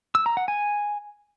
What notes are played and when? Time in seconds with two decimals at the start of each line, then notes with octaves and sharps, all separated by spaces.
0.15 E6
0.26 A#5
0.37 F#5
0.48 G#5